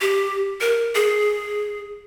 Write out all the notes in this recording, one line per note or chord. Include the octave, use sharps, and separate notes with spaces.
G4
A#4
G#4